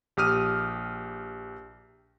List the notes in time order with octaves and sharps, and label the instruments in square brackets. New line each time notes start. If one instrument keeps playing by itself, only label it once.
[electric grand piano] A#1 G4 D#6 F6 D#7